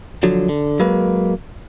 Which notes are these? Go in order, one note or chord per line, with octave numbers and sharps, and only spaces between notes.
D3 F3 F#3
D3
F#3 G#3 A#3 B4